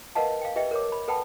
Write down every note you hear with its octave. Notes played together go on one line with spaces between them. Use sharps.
A#4 B4 D#5 F5 F#5 A5
F5 G5
G4 B4 D#5 E5 G5
A#4 C#5 D6
B5
A4 B4 F#5 G5 A5 B5